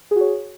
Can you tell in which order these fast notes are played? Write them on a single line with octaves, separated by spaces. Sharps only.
G#4 F#4 C#5